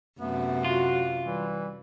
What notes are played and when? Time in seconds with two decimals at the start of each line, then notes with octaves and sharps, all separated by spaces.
0.20 F#2 C3 A3 B3
0.65 F4 F#4
1.24 E3 G3